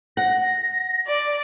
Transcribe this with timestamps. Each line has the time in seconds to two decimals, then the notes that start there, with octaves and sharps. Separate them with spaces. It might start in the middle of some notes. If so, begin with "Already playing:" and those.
0.17 F#5 A#6
1.07 D5